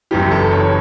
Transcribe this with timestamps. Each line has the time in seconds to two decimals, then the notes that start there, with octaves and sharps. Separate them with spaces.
0.11 F#1 F#2 E3 G4
0.31 A4
0.52 C#5